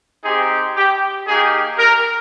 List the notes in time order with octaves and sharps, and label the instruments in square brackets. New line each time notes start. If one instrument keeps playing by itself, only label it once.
[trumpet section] C4 D#4 G4 G#4
G4
A#3 D#4 G4 G#4
A#4